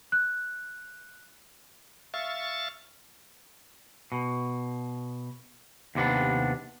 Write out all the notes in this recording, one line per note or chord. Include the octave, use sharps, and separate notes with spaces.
F#6
E5 F5 C#6 A6
B2
D#2 C3 B3 D4